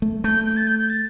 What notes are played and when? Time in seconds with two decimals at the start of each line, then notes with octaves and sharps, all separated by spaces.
0.02 A3
0.24 A3 G6
0.46 G6
0.57 A6
0.67 G6
0.79 G6
0.90 A6